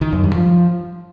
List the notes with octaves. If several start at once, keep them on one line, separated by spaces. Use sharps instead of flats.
D#3
F#2
G2
F3